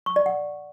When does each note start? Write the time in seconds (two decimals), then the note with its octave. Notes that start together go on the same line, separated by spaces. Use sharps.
0.06 C#6
0.16 D5
0.26 F#5